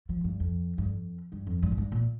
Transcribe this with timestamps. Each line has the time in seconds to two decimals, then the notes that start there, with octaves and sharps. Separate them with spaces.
0.09 F3
0.24 G2
0.40 F2
0.78 G2
0.85 F2
1.32 G2
1.47 F2
1.62 G2
1.72 A2
1.78 G2
1.92 A#2